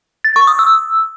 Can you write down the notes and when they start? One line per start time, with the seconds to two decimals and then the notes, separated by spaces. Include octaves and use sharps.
0.24 A6
0.36 C#6
0.47 D#6
0.59 E6